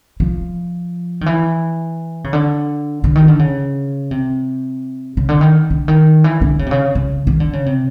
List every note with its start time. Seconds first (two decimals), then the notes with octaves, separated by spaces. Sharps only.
0.20 F3
1.21 D#3
1.26 E3
2.24 C#3
2.33 D3
3.04 D3
3.16 D#3
3.28 D3
3.39 C#3
4.11 C3
5.17 C#3
5.29 D3
5.41 D#3
5.70 D3
5.88 D#3
6.24 E3
6.41 D3
6.59 C#3
6.66 C3
6.71 C#3
6.95 C#3
7.27 D#3
7.40 D3
7.53 C#3
7.66 C3